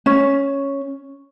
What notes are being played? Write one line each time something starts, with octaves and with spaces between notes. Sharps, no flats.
C#4